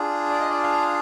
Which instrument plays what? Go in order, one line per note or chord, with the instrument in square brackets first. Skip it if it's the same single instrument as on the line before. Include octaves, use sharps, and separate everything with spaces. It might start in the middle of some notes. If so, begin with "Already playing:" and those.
Already playing: [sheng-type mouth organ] D4 F4 G#4
D5
D#5
D5
F5